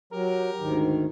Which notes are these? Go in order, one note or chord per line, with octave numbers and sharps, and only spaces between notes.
F#3 G4 A#4
D2 G#2 D#3